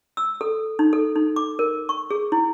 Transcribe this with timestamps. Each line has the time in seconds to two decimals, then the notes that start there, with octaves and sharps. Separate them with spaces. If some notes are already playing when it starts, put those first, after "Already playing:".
0.17 E6
0.41 A4
0.79 D#4
0.93 A4
1.16 D#4
1.36 D6
1.59 A#4
1.89 C#6
2.11 G#4
2.32 E4